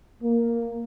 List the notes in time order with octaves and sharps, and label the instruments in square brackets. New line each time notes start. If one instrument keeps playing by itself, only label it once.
[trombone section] A#3